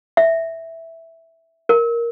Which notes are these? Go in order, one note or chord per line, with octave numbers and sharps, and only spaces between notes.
E5
A#4